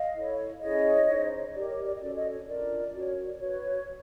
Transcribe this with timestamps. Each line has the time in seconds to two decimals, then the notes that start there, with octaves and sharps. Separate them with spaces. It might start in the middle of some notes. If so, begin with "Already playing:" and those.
Already playing: D#5 F5
0.15 E4 A4 C#5
0.61 C#4 E4 G#4 C#5 D#5
1.07 D#4 G#4 C5
1.53 D#4 G4 A#4 D5
1.69 C#5
1.85 D5
1.94 D#5
2.00 C#4 F#4 A4 D5
2.15 C#5 D#5
2.31 C#5
2.46 D4 F4 A#4 D5
2.92 C#4 F#4 A#4 C#5
3.39 F#4 B4 C#5